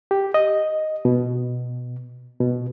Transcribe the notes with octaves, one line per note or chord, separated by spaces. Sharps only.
G4
D#5
B2
B2